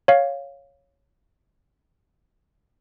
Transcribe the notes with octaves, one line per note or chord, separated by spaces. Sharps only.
C#5 F5